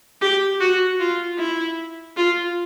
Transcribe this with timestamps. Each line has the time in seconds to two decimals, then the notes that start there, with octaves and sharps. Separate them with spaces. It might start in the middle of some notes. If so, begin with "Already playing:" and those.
0.21 G4
0.61 F#4
1.00 F4
1.39 E4
2.17 F4